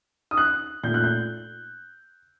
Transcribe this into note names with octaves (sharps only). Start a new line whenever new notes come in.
D#6
F#6
A#2 A3 G6
F#6
G6